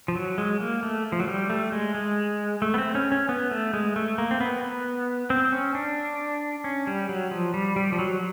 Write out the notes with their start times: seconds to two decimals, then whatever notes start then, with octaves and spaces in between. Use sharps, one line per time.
0.08 F3
0.15 F#3
0.38 G#3
0.60 A#3
0.83 A3
1.12 F3
1.20 F#3
1.28 G3
1.50 A3
1.72 G#3
1.95 G#3
2.62 A3
2.74 B3
2.78 C4
2.95 C#4
3.12 C#4
3.29 B3
3.51 A3
3.74 G#3
3.96 A3
4.18 A#3
4.31 C4
4.41 B3
4.63 B3
5.30 C4
5.52 C#4
5.75 D4
6.64 C#4
6.87 G3
7.09 F#3
7.31 F3
7.54 G3
7.76 G3
7.92 F3
7.99 F#3